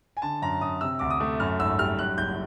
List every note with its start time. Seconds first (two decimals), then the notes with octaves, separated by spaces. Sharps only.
0.17 G#5
0.22 D3 A5
0.42 F#2 A#5
0.61 F#2 D#6
0.81 C3 E6
0.99 D2 D6
1.10 D#6
1.20 A3
1.40 F#2 F6
1.59 G#1 E6
1.79 G3 F6
1.98 F#2 F#6
2.17 F#1 G6